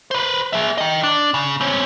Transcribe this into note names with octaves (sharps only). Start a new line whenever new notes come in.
B4 C5
G#4 E5
D#5 G5
D4
C#3
C4 C#4